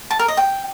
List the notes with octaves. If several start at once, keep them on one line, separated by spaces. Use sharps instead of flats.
A5
A#4
D#5
G5